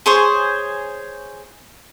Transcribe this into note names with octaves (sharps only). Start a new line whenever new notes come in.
G#4 C5 C#5